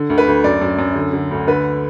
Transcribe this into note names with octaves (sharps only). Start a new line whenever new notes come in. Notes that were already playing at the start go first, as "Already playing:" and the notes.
Already playing: D3
D2
B4
D2
F#2 D5
F#2
F#2
D3
D3
D2
D3 B4